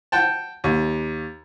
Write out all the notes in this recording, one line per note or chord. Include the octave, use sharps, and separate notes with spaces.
F#5 G5 A5
D#2